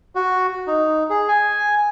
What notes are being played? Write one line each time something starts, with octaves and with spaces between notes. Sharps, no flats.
F#4
D#4
G#4
G#5